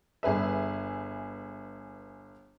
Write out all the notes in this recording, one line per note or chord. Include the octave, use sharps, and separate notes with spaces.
G1 G#4 B4 E5